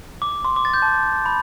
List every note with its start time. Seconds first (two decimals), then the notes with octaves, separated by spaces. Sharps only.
0.22 D6
0.45 C6
0.56 D6
0.65 A6
0.74 G6
0.82 A5
1.26 B5